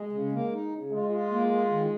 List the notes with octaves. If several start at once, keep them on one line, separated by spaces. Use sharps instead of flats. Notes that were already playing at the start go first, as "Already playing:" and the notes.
Already playing: G#3
C#3
A#3
D#4
C#3
G#3 F4
F4
A#3
F4
D#3